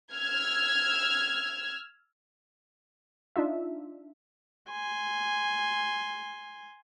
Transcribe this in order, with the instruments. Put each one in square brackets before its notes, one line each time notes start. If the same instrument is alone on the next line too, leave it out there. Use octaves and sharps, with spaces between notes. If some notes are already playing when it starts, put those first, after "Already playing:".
[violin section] E6 F6 G#6
[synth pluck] D4 D#4 F4 E5
[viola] G#5 C6